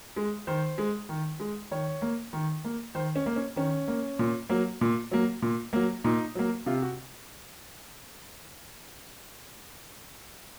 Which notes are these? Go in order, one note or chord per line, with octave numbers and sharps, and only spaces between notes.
G#3
D#3 C5
G#3
D#3
G#3
D#3 C#5
A#3
D#3
A#3
D#3 C5
C#4
A#3
C#4
D#3 C#4
A#3
A#2
F#3 A#3
A#2
F#3 A#3
A#2
F#3 A#3
A#2 D#4
F#3 A#3
C3 F4
F#4